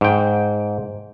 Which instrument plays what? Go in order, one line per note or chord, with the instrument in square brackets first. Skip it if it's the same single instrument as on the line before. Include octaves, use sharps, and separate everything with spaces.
[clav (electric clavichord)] G#2 G5